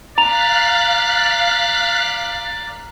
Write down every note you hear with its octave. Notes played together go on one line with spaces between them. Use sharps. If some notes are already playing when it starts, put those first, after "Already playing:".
D5 F5 A#5 F#6 B6 F7